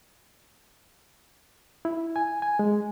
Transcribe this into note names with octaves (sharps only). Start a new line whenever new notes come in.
E4
G#5
G#5
G#3